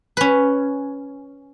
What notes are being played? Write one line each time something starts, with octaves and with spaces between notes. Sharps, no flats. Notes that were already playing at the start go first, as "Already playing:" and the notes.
C#4 B4